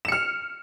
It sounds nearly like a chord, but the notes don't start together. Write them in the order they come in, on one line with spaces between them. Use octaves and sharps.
E7 C#7 F6